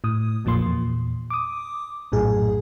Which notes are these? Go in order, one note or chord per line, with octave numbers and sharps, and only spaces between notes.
A2 D#6
A#1 F2 A#2 F3 A#3 C6
E2 A#2
D6 D#6
A#1 F#2 A2 G#4